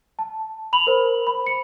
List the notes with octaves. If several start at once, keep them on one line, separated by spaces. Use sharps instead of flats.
A5
B5 F7 F#7
A#4 C5
B5
C#7